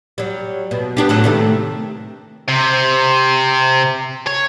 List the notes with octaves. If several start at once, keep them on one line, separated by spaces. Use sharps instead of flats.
F#3 G3
B2
B3 D4 G4
A2 F#3 A4
C3 D#3 A3
C3
C#5